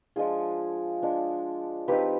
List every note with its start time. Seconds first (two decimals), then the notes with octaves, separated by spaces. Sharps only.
0.16 F3 G#3 D4 F4 G#4
1.02 F3 G#3 D4
1.88 F3 C4 D#4 G4 B4